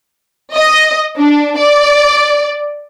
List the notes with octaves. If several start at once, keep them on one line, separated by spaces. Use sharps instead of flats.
D#5
D4
D5